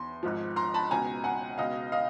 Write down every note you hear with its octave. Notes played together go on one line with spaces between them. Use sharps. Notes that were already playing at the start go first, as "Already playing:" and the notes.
Already playing: E2 C6
G#1 G#2 F3
A#5 C6
A5 B5
C#2 B2 G#5 A#5
F#5 G#5
C#2 B2 D#5 F5
D#5 F5